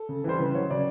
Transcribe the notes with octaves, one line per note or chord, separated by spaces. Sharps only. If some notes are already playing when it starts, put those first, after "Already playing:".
Already playing: A4
C#3
E3 G3 C5
C#3 B4
F#3 C#5
C#3 D5